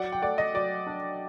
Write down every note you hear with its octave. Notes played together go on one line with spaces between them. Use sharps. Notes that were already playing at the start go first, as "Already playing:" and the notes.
Already playing: F#3 D5 F#5
G5
A3 D5 F#5
D#5
F#3 D5
D4